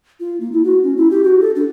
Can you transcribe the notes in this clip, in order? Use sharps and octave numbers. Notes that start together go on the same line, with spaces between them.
F4
A#3
E4
F#4
C#4
E4
G4
F#4
A4
D4